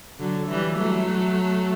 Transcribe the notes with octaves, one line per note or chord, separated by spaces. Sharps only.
D3 F#3
E3 G3
F#3 A3